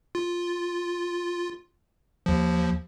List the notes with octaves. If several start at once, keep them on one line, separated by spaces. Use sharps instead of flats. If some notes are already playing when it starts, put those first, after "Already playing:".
F4
D#2 F3